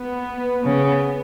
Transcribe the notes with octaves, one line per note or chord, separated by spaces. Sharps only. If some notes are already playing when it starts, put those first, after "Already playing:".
Already playing: B3
C#3 B3